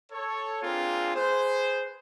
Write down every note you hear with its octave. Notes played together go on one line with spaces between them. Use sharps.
A4 C#5
A#3 C4 D4 F4 G#4
G#4 B4 C5